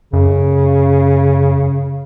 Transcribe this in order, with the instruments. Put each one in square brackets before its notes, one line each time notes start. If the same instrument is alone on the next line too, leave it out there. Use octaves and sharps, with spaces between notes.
[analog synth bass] F#2 [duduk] C#3